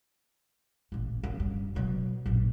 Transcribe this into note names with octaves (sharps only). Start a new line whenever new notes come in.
A1 A#2
F#2
G2
B2 F#3
A#1 F#2